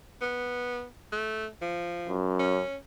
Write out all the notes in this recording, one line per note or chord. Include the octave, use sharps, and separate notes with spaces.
B3
A3
F3
F#2
C#4